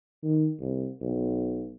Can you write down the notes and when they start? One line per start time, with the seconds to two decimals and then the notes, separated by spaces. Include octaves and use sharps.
0.23 D#3
0.60 C2
1.02 B1